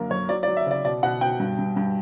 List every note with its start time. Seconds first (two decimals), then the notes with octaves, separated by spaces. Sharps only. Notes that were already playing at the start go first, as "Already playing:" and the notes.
Already playing: F#2 D3 A#3 A#4
0.10 F#2 C#5
0.29 F#3 D5
0.43 D5
0.47 F#3
0.57 E5
0.66 C#3 D5
0.84 B2 D5
1.03 B2 F#5
1.21 B2 G5
1.40 G2
1.59 G2
1.76 G2